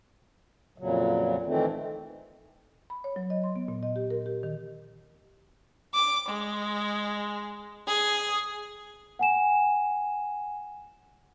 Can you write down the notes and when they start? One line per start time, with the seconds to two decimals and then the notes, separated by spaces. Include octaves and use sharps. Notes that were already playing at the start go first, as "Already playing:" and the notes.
0.78 F2 A#2 C#3 F#3
1.46 D#3 E3 A3 C4
2.90 B5
3.04 C#5
3.16 F#3
3.30 D#5
3.44 C6
3.56 B3
3.68 A#2
3.83 D#5
3.96 G4
4.10 A#4
4.26 G4
4.43 D#3
5.93 D6
6.28 G#3
7.88 G#4
9.19 F#5 G#5 E7